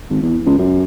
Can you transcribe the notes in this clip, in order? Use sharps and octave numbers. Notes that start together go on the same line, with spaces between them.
G#1
E2
C#2
F#2